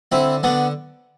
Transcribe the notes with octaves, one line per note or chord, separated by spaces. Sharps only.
D3 C4 E4
D3 B3 D4